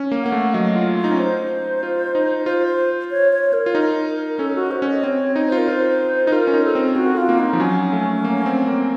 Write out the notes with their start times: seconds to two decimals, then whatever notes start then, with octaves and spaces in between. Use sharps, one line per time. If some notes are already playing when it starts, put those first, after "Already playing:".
Already playing: C#4
0.11 A#3
0.22 A#3 F#5
0.32 A3
0.54 F#3 D#5
0.76 F4
0.97 F4
1.04 D#4
1.11 C#4
1.18 D#4 C5
1.83 F4
2.15 D#4
2.46 F4 C5
2.68 C5
3.11 C#5
3.33 C#5
3.53 A#4
3.66 F4
3.75 D#4
4.39 C#4 A4
4.55 F#4
4.71 C5
4.82 C#4
4.88 D#5
5.03 C4 C#5
5.36 D#4 C#5
5.47 C5
5.52 F4
5.58 A#4
5.68 F4 C5
6.27 D#4
6.32 F4 A#4
6.47 C#4
6.54 D#4
6.64 A4
6.75 C4
6.96 C4 F#4
7.17 F4
7.29 A#3
7.39 D#4
7.53 F3
7.60 F#3 C#4
7.93 A3
8.24 A#3
8.46 C4
8.67 A#3